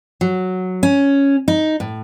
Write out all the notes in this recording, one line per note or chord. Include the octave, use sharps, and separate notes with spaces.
F#3
C#4
D#4
A2